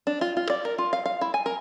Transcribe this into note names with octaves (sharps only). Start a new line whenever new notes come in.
D4
F4
F4
D5
A#4
F4
F5
F5
E4
G#5
A#4